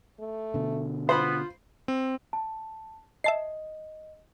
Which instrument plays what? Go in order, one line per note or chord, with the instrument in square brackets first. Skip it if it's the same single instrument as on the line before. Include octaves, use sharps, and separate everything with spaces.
[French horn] A3
[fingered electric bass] B2 D3
[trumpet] B3 [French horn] F4 [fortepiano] C5 B5 C6
[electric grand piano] C4
[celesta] A5
[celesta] D#5 [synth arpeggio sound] E5 A5 C7